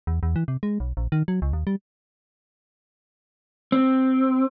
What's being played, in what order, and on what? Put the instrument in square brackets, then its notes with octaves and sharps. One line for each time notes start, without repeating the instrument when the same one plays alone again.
[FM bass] E2
E2
E3
C3
G#3
B1
A#1
D#3
F#3
C#2
D#2
G3
[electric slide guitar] C4